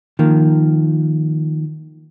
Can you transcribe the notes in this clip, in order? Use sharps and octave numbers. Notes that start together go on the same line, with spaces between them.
D#3 F3 A#3